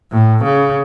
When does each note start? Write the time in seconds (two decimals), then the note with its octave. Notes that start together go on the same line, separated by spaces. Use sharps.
0.12 A2
0.44 C#3